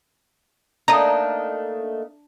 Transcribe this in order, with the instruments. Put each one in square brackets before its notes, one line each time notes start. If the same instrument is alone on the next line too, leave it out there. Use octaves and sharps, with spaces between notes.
[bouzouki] A3 A#3 D#4 [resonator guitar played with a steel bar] D4 [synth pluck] A#5 D#6